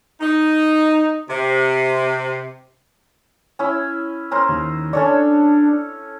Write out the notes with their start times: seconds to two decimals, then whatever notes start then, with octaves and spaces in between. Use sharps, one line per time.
0.20 D#4
1.29 C3
3.59 C#4 E4 E5
4.31 C#4 A#4 C5
4.49 D#2
4.93 C#4 D4 A4 C#5